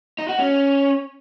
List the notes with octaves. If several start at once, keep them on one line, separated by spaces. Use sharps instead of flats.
D#4
F#4
C#4